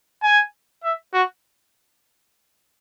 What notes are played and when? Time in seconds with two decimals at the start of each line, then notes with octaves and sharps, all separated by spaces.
0.23 G#5
0.83 E5
1.13 F#4